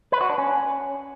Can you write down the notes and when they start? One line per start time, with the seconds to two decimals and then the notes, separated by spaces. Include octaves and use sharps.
0.12 B4
0.21 F#4
0.29 D4
0.38 C#4